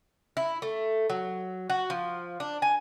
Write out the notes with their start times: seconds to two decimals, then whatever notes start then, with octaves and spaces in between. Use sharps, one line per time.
0.37 E4
0.62 A3
1.10 F#3
1.70 F#4
1.90 F3
2.40 D4
2.62 G#5